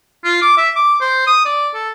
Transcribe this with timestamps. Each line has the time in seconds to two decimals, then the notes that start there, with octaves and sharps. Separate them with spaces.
0.24 F4
0.42 D6
0.58 E5
0.76 D6
1.01 C5
1.27 D#6
1.45 D5
1.74 A4